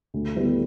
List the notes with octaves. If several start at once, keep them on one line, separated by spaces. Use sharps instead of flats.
D2
D3 G3 B3 E4